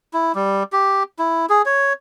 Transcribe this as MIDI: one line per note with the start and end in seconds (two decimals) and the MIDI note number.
0.14 0.32 64
0.35 0.63 55
0.73 1.03 67
1.19 1.46 64
1.49 1.62 68
1.66 1.93 73